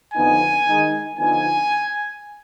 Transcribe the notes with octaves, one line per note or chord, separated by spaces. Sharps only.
F2 D3 F3 B3 D#4 G#5
D#3 G#3 D#4
D3 F3 B3 D#4 G#5